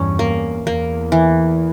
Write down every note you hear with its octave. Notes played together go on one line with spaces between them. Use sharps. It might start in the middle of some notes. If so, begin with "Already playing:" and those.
Already playing: E2 G2 C#4
A#3
E2 A#3
E3